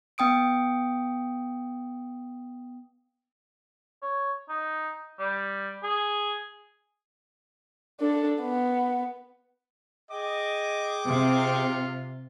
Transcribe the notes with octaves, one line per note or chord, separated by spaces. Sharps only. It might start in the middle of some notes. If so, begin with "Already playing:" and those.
B3 G5 D#6 D7
C#5
D#4
G3
G#4
D4 A4
B3
G#4 D#5 G5 D6
C3 F4